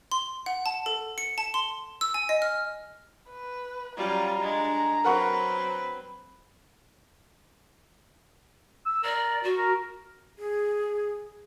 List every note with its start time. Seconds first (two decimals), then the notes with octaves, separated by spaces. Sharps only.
0.12 C6
0.46 F#5
0.66 A5
0.86 A4
1.18 C#7
1.38 A5
1.54 C6
2.01 E6
2.14 G#5
2.29 D#5
2.42 F6
3.30 B4
3.97 F#3 G3 C#4 F4 A#5
4.41 G#3 D4
5.04 F#3 C4 A#4 B4 F#5 C#6
8.86 E6
9.03 A#4 D5
9.43 F#4
9.57 A#4
10.39 G#4